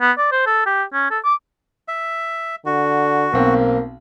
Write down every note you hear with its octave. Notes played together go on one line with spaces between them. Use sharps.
B3
D5
C5
A4
G4
C#4
A4
D6
E5
D3 F#4
B1 A#3 C4